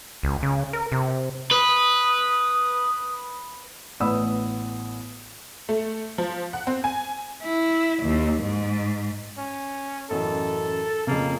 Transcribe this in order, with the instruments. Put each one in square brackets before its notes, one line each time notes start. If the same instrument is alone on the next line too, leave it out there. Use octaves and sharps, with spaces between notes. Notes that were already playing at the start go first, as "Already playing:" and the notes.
[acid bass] C#2
C#3
A#4
C3
[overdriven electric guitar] B4 [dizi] D#6
[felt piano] A1 B3 D5 B5 D#6 E6
[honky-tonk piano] A3
F3
F#5
C4
G#5
[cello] E4
D#2
G#2
[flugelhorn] C#4
[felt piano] A1 F#2 [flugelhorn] A4
[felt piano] F2 C#3 [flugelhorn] A#3